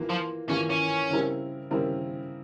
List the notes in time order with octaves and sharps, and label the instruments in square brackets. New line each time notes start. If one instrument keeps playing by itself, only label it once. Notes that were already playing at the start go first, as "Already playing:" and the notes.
Already playing: [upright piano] E3 A#3 F4
[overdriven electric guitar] F3
[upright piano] E3 A#3 F4 [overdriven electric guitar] C#4
[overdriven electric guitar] C#4
[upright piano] C#3 G3 C4 E4 A#4
C#3 G3 C4 E4 A#4